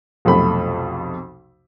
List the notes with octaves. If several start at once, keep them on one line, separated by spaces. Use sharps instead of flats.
B1 F2 C3 A3 B5